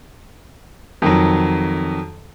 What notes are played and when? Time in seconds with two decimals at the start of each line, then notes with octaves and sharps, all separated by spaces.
1.02 F2 D#3 F#3